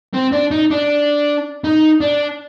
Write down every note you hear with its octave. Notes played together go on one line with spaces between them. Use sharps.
C4
D4
D#4
D4
D#4
D4